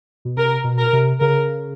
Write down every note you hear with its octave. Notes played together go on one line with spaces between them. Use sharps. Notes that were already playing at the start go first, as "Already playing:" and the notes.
B2
C3 A#4
B2
A#4
C3
C#3 A#4